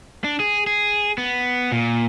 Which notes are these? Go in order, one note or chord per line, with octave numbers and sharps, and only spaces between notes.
D4
G#4
G#4
B3
A#2